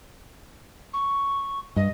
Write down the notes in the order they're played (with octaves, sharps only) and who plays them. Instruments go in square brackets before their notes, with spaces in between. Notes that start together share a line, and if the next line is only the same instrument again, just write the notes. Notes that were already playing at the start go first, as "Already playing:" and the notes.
[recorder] C#6
[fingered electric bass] G2 [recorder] D#5